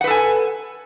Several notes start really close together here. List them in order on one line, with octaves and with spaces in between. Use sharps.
F#5 B4 A4 G#5